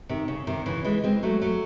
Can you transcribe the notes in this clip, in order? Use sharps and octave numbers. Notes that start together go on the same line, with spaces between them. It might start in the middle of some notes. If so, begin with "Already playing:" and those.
C3 D#3
C#3
C3 D#3
C#3 E3
E3 G#3
G#3 C4
F#3 A3
F#3 A3